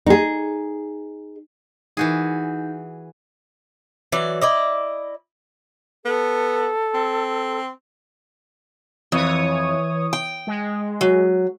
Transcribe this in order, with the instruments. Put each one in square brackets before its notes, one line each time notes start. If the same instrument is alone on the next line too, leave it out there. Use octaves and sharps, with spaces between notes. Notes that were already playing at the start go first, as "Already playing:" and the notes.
[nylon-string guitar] D#4 G#4
[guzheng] E3 F#4 G#4 [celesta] D#4 G6
[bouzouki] E3 F#3 D5
E4 D5 D#5
[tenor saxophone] B3 [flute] A4
[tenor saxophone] C4
[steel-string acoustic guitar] F2 [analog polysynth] E3 C#5 D#6
[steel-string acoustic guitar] G5
[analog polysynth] G#3
[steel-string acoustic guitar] F#3